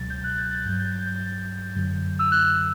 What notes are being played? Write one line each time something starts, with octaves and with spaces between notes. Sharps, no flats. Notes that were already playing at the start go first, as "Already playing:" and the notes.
Already playing: C#2 B2 F#3 A6
G6
F#6
A6
A6
G2 F#3 G6
G6
A6
G6
F#2 D3 F#3
E6
F#6